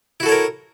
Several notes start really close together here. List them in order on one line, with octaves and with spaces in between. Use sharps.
E4 F#4 A4 C#5 A#4